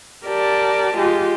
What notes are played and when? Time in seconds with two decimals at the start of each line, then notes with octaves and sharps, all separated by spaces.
0.25 G4 A#4 D5 A5
0.96 G#3 F4 G4